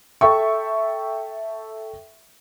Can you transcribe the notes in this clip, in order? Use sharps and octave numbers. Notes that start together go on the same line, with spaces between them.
A4 E5 G5 C#6